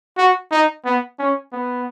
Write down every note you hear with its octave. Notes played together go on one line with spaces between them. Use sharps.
F#4
D#4
B3
C#4
B3